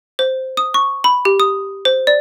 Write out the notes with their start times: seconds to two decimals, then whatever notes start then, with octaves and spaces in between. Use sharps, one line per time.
0.19 C5
0.57 D#6
0.74 C#6
1.04 B5
1.25 G4
1.40 D#6
1.85 C5
2.07 D5